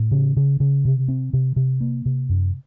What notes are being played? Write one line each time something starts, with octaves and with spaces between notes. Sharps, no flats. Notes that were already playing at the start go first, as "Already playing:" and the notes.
Already playing: A2
C#3
C#3
C#3
C3
C4
C3
C3
A#3
C3
F#2